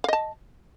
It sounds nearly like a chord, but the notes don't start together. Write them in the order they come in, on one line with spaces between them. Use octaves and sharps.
F5 D#5 A5